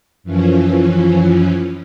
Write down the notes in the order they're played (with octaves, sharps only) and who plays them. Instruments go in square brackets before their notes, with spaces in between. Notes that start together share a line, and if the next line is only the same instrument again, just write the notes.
[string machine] F#2 E3 F3 C#4